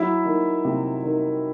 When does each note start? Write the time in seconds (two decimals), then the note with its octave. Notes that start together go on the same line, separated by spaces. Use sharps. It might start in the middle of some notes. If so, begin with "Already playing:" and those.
Already playing: F#3 E4 E5
0.25 D#3
0.65 C3
1.04 D#3